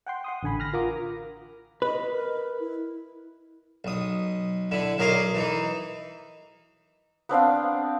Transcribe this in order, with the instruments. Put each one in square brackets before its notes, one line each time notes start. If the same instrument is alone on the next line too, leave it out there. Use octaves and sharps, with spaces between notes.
[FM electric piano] F#5 G5 C6
F#5 C6 D#6
A1 D3 G#5 B5
B5 F6 F#6 A#6
F4 A#4 F#5 D6 D#6 A#6
[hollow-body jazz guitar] B4 [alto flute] D#5
[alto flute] A#4
E4
[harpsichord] B1 D#6
D3 E4
B1 F#3 A#4 D#5 C6 D6
E3 D#4
[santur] B3 C4 D4 F5